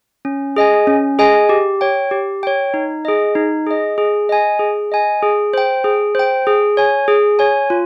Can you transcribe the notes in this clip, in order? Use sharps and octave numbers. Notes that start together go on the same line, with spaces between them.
C#4
G#4 D#5 G#5
C#4
G#4 D#5 G#5
G4
C#5 G5
G4
C#5 G5
D#4
G#4 D#5
D#4
G#4 D#5
G#4
D#5 G#5
G#4
D#5 G#5
G#4
C5 G5
G#4
C5 G5
G#4
C#5 G#5
G#4
C#5 G#5
F4